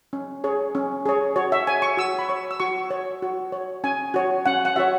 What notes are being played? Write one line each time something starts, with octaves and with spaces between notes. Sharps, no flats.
C#4
G#4 C#5
C#4
G#4 C#5
F#4 C#5
E5
C#5 G#5
C#6
F#4 E6
B5
C#5 C#6
E6
F#4 C#6
C#5
F#4
C#5
C#4 G#5
F#4 C#5
C#4 F#5
F#5
F#4 C#5 E5